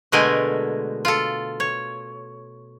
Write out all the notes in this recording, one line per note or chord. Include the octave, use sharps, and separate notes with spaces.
B2 D3 G#3 A3 A#4 G#5
F4 A4
C#5